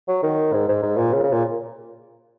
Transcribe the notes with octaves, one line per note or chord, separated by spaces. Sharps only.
F#3
D#3
G#2
G#2
G#2
A#2
C#3
C#3
A#2